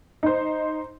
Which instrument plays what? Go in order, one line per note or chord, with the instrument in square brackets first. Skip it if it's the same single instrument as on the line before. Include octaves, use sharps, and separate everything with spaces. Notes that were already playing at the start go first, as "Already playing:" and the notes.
[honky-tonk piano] D#4 C5